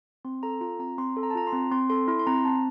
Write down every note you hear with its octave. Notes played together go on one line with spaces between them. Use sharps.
C4 C6
A4 A#5
F4 A#5
C4 A#5
C4 C6
A4
A#5
A5
F4 A#5
C6
C4
C4 C6
A4 C6
E4 C6
C6
C4 A#5
C4 A5